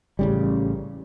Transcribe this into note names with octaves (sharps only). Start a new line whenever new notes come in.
A1 C#3 G3